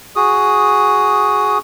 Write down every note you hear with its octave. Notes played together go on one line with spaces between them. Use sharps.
F#4 G#4 D#6